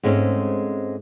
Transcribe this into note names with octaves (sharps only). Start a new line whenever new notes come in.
G#2 G#3 A3 C4 C#4